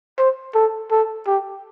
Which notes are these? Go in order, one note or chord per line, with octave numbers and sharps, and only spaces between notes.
C5
A4
A4
G4